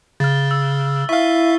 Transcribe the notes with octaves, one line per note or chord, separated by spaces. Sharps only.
C#3 F6 A6
E6
E4 E5 F5 C#6 F6